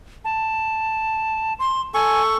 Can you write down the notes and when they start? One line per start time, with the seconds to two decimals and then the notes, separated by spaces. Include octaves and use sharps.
0.25 A5
1.59 C6
1.94 A4 G#5 C#6